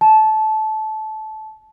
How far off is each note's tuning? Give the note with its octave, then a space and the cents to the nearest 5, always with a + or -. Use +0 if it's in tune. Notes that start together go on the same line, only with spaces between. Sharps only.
A5 -20